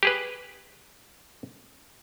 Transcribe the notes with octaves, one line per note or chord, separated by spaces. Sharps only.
G4 G#4 B4